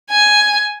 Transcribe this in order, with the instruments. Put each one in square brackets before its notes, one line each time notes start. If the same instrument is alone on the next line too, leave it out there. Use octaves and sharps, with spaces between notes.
[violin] G#5